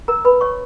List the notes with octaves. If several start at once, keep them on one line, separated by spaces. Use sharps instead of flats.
A#4 A#5
B4 B5
C#5 C#6